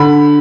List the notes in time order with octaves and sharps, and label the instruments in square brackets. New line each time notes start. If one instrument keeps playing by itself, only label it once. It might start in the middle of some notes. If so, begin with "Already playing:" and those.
Already playing: [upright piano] D3 B5